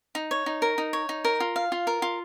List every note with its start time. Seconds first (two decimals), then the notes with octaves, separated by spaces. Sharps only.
0.15 D#4
0.31 C#5
0.46 D#4
0.62 A#4
0.78 D#4
0.93 C#5
1.09 D#4
1.25 A#4
1.40 F4
1.56 F5
1.72 F4
1.87 A#4
2.02 F4